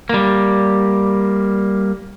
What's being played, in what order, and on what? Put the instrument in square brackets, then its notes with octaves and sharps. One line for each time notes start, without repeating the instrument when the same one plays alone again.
[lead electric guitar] G3 A#3